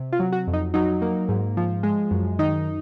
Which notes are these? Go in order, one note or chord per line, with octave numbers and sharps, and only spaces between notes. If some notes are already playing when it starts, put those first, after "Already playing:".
Already playing: C3
F4
F#3
F#4
F2
D#4
F#3 D#4
A#3
G#2
F3
G#3
F#2
D#3 D#4